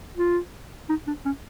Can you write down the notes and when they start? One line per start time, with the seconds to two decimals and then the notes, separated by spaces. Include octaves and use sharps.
0.17 F4
0.89 D#4
1.07 D4
1.25 C#4